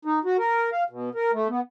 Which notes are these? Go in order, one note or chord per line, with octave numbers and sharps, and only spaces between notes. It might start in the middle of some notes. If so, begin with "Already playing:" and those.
D#4
F#4
A#4
F5
B2
A#4
A3
B3